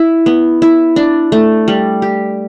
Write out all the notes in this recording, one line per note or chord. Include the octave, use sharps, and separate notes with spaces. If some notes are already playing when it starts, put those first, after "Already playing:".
Already playing: E4
B3
E4
D4
A3
G3
G4